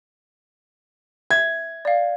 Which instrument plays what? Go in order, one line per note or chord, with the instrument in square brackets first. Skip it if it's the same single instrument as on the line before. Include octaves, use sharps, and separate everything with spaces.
[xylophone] E5 [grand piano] G#6
[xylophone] D5 F5